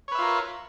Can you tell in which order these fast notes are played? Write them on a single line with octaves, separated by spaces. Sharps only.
C#5 B4 E5 F4 A#4